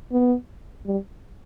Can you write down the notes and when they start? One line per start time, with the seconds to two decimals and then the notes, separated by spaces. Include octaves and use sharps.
0.12 B3
0.86 G3